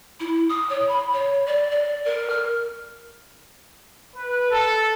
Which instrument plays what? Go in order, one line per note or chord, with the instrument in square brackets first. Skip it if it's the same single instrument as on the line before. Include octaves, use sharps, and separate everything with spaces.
[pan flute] E4
D#6
C#5
B5
C#5
D5
D5
A#4
F6
[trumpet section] B4
A4